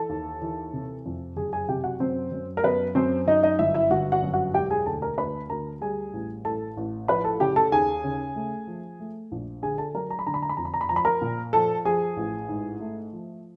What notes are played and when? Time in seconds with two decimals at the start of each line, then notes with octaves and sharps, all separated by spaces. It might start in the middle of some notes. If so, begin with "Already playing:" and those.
Already playing: E3 A4 A5
0.09 D#2
0.42 E3
0.73 C3
1.05 F2
1.36 F#1 G#4 G#5
1.52 G#4 G#5
1.68 C3 G4 G5
1.84 F#4 F#5
2.00 F#2 C4 C5
2.32 F#2
2.57 A#4
2.64 F#2 B3 B4
2.95 F#2 C4 C5
3.27 F#2 D#4 D#5
3.43 D#4 D#5
3.59 G1 E4 E5
3.74 E4 E5
3.91 G1 F#4 F#5
4.12 F#4 F#5
4.22 F#2
4.34 F#4 F#5
4.54 E1 G4 G5
4.70 G#4 G#5
4.86 D2 A4 A5
5.02 A#4 A#5
5.18 D2 B4 B5
5.50 D2 A#4 A#5
5.81 G3 G#4 G#5
6.13 A1
6.45 A1 A4 A5
6.77 A1
7.08 F3 B4 B5
7.24 A4 A5
7.40 C#3 G4 G5
7.56 A4 A5
7.72 D#2 G#4 G#5
8.04 C#3
8.35 A3
8.67 F3
9.00 A3
9.32 A#1
9.62 D3 G#4 G#5
9.78 A4 A5
9.95 F#3 A#4 A#5
10.10 A#5
10.19 B5
10.26 D3 A#5
10.34 B5
10.42 A#5
10.49 B5
10.57 F2 A#5
10.65 B5
10.74 A#5
10.81 B5
10.89 F3 A#5
10.96 B5
11.05 A#4 A#5
11.22 A#2
11.53 F3 A4 A5
11.85 F3 G#4 G#5
12.17 A1
12.49 G#2
12.80 A3
13.13 F3